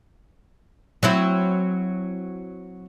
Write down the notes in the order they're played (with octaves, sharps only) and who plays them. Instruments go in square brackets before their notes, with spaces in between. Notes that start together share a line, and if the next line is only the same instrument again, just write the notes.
[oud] F#3 C4 E4